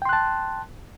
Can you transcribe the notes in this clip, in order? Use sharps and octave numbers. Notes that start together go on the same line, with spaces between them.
G5 A5 C6 F#6